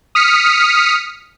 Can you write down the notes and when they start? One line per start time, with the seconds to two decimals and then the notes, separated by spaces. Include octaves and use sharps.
0.15 D#6 F6 B6 C#7